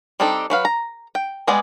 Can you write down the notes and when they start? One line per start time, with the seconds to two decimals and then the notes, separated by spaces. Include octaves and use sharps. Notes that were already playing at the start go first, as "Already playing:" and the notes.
0.20 G3 C4 D4 D#4 A4
0.50 F#3 B4 F5
0.65 A#5
1.15 G5
1.47 G3 G#3 B3 G#4 D5